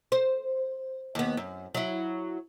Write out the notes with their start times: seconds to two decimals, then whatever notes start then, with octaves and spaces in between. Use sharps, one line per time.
0.12 C5
1.15 D#2 B3
1.37 F#2
1.75 F#3 E4